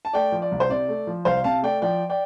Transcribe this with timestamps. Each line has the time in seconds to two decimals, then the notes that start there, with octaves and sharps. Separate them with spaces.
0.05 A5
0.13 A3 D5 G5
0.32 F3
0.42 D5
0.52 C2
0.60 C5
0.70 C3 D5
0.88 A3
1.07 F3
1.25 C2 C5 F5
1.44 C3 F5 A5
1.63 A3 D5 G5
1.82 F3 D5 G5
2.10 D5 G5